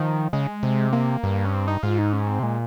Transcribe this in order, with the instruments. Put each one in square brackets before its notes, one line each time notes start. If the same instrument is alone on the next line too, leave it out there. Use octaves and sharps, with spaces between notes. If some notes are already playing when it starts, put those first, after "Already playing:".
Already playing: [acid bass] D#3 [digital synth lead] F3
[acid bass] C#3 [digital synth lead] G#3
[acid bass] C3
[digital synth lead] A#3
[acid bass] G2
[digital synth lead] C#4
C4
D#4
[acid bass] G#2 [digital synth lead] F4
[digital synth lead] D#4
C#4
C4
[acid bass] C3
[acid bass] A#2 [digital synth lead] G#3